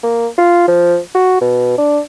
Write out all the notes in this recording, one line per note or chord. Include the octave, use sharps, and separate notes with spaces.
A#3
F4
F3
F#4
B2
D4